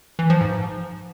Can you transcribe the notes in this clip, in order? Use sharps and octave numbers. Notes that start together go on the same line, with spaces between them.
E3
F3
G#2